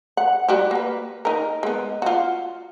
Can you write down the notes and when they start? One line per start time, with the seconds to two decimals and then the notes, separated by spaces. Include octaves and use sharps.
0.17 F#5
0.48 G3 F#4 G4
0.71 A#3 B4
1.25 D#4 A#4
1.63 G#3 B3
2.02 F4 F#4